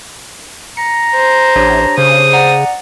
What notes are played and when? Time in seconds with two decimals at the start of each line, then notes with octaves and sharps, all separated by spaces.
0.77 A#5 C#7
1.15 C5
1.56 A1 D4 G4 C#5
1.98 C#3 C5 D#6
2.33 D5 F#5 A#5